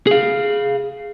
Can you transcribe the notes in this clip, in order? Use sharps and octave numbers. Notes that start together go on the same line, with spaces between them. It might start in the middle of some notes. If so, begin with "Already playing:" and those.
G#4 F5